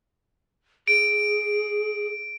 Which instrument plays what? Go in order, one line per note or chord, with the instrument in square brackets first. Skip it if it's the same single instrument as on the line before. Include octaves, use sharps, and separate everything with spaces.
[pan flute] G#4 [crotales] D7